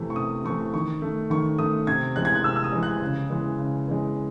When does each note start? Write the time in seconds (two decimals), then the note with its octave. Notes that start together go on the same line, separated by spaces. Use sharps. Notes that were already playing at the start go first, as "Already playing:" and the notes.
Already playing: C3 E3 A3
0.10 C#6
0.16 C3 D#6
0.44 E3 A3 C#6
0.74 D#3 C#6
1.02 A3
1.30 D#3 C#6
1.58 A3 D#6
1.87 C3 G#6
2.16 E3 G#3 F#6
2.25 G#6
2.35 F#6
2.44 C3 E6
2.56 E6
2.64 D#6
2.72 E3 G#3
2.83 F#6
3.01 C#3
3.30 E3 G#3
3.58 C#3
3.87 E3 G#3